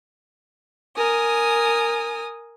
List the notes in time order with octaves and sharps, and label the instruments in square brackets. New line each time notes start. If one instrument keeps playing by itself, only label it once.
[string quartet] A#4 G#5 D#6